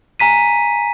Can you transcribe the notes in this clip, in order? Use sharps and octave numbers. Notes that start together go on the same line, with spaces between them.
G#5 A#5 B6 D#7